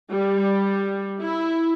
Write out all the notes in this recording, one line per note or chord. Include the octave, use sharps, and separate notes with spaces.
G3
E4